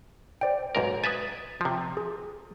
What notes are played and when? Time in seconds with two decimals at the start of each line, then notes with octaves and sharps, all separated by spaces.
0.41 C5 D5 G5
0.75 B1 G#2 A#4
1.04 B4 E5 G#5 D#6 A6
1.61 C3 F3
1.97 G#4